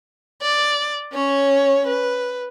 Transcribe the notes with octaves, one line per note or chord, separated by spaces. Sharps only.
D5
C#4 C#5
B4